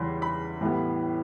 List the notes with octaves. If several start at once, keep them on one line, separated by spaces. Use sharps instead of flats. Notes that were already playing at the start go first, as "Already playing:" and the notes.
Already playing: E2 C#3 E3 G3 B5 C6
B5
A2 E3 G3 B3